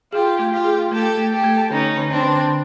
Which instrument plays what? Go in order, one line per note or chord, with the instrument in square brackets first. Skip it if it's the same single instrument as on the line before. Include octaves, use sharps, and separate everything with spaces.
[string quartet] F4 G4 [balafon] G#4
[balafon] A3
[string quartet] F4 G4
[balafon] G#4
[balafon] A3 [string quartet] G4 A4
[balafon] A3
[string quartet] G4 A4
[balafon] A3
[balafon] D3 [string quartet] C#4 D#4
[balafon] D3
[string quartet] C4 D4
[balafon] D3
D3